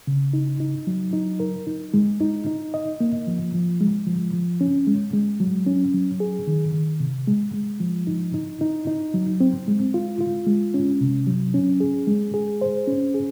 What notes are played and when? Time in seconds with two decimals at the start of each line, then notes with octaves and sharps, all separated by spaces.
0.07 C#3
0.33 D#4
0.60 D#4
0.87 F#3
1.13 D#4
1.40 A#4
1.67 D#4
1.94 G#3
2.21 D#4
2.47 D#4
2.74 D#5
3.00 A#3
3.27 F3
3.54 F3
3.81 G#3
4.07 F3
4.33 F3
4.61 C#4
4.87 G#3
5.13 G#3
5.40 F#3
5.67 C#4
5.94 F#3
6.20 G#4
6.48 D#3
6.74 D#3
7.00 C3
7.28 G#3
7.53 G#3
7.80 F3
8.07 D#4
8.34 D#4
8.61 D#4
8.87 D#4
9.14 F#3
9.41 C4
9.68 G#3
9.94 F4
10.21 F4
10.47 G#3
10.74 C#4
11.01 C3
11.27 F#3
11.54 C#4
11.80 G#4
12.07 G#3
12.34 G#4
12.61 C5
12.87 C#4
13.14 G#4